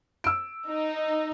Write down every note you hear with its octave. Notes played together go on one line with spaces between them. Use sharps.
E6 D7
D#4